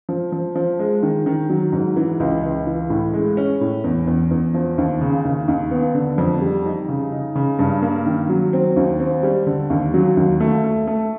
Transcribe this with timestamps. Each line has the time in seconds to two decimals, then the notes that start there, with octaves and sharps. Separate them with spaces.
0.09 F3
0.32 F3
0.56 F3
0.79 G#3
1.03 D#3
1.26 D#3
1.49 F#3
1.72 G#2
1.96 E3
2.20 C#2
2.43 C#2
2.67 E3
2.90 A2
3.14 G#3
3.37 C#4
3.61 A2
3.84 E2
4.07 E2
4.31 E2
4.54 F3
4.78 D#2
5.01 C#3
5.24 D#2
5.48 D#2
5.71 B3
5.95 D3
6.18 F2
6.41 G3
6.65 D#4
6.89 C#3
7.12 D#4
7.35 C#3
7.59 G2
7.82 A#3
8.06 D#3
8.29 F#3
8.53 C4
8.76 D#2
9.00 C4
9.23 G3
9.47 D3
9.70 D#2
9.94 F#3
10.17 D#2
10.40 A3
10.64 A3
10.87 A3